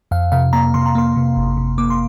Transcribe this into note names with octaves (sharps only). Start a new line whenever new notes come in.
F2 F5
C3 F5
A#3 A#5
C3 C6
A#5
A#3 C6
C3
G1
C3
A#3 D6
C6